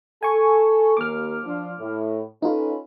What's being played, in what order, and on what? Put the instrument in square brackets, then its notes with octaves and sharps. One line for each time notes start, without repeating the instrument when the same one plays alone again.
[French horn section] A4 [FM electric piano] G#5 C#6
[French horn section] D#2 A#3 [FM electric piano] D6 F6
[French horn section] F3 D4 F4
A2
[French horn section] C#4 A4 B4 [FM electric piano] D#4 F4